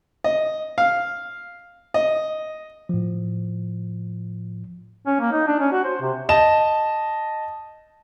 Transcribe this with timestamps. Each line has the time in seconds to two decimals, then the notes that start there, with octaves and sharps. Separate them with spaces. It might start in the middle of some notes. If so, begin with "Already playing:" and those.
0.24 D#5
0.78 F5
1.94 D#5
2.89 A2 F3
5.06 C#4
5.20 A#3
5.32 D#4
5.47 D4
5.59 C#4
5.71 F#4
5.84 C5
6.01 C3
6.29 D#5 A5 E7